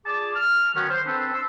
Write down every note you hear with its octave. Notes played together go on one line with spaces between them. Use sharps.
F4 G#4 D5 A5 D6
F6
D#3 F#3 B3 C#4 F#4
C5
C4 D4 A4 B4 C5
C6 E6